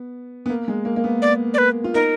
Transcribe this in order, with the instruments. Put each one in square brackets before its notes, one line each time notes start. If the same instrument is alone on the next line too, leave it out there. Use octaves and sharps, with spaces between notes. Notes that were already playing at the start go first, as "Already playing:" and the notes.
Already playing: [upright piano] B3
B3
A#3
G#3
A#3
A#3
B3
[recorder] D5
D5
B4
[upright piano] F4
[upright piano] D#4 [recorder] A#4